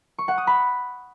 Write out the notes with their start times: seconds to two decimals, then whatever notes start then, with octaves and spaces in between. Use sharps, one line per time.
0.18 C#6
0.28 F#5
0.38 D#6
0.47 B5